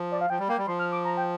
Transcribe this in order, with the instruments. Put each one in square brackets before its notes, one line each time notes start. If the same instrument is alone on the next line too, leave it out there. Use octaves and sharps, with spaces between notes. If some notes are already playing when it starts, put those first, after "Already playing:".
Already playing: [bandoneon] F3
[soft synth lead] D5
F5
[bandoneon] F3 [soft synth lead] G5
[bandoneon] G3
[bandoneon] A#3 [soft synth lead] G5
[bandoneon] G3
[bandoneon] F3 [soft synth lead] C6
[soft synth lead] F6
D6
A#5
G5